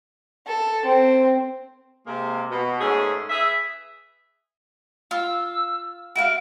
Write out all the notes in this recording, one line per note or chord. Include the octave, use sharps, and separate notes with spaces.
A4
C4
C3 G#3 A#3
B2
G#2 A3 C#4 G#4
G#4 B4 E5
F4 F5 E6
F#4 E5 F5 D7